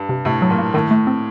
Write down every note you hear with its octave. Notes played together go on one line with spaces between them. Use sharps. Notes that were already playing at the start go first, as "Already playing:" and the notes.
Already playing: G2
C3
A2 C3
F#3
A#2
A#3
A2 D#3
A3
C4